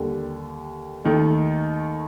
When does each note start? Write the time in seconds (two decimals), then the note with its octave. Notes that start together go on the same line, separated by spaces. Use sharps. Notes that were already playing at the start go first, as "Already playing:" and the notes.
Already playing: D#2 D3 G3
1.05 D#2 D#3 A3 D#4